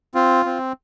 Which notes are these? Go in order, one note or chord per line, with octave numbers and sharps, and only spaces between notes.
C4 F4
C4